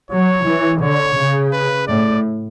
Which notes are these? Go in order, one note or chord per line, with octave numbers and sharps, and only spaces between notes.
F#3 C#5
E3
D3 C#5
C#3
B4
A2 D5